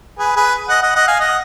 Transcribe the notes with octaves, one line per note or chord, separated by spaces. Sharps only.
G#4 B4
G#4 B4
D#5 F#5
D#5 F#5
D#5 F#5
F5 G#5
D#5 F#5